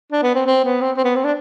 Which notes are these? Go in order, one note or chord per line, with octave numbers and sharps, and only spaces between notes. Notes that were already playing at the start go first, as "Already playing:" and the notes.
D4
B3
C4
C4
B3
C4
C4
B3
C4
D4